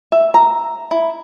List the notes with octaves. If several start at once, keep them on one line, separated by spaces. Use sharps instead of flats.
E5
A#5
E4